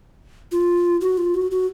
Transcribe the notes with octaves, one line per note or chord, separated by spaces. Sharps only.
F4
F#4
F4
F#4
F#4